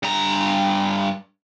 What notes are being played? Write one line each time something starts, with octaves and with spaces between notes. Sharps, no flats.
G2 A#5